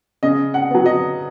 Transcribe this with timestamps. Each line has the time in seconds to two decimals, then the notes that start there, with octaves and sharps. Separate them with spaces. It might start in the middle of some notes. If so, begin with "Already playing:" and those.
0.23 C#3 D#5
0.54 F#5
0.70 F#3 B3
0.86 D#5